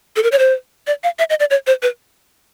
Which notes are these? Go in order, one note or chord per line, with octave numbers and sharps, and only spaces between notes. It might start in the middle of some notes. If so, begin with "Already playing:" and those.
A4
A#4
C#5
C5
D5
F5
E5
D#5
D5
C#5
C5
B4